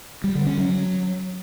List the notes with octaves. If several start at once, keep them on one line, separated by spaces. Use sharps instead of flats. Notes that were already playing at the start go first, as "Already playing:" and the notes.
G3
D3
C#4
F#3